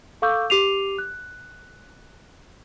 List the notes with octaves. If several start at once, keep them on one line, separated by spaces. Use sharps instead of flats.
A4 F5 C#6 D6 E6 G6
G4 D6 C7 D#7 F7
F#6